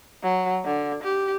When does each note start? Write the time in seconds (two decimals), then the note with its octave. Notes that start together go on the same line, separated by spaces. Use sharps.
0.23 F#3
0.64 D3
1.04 G4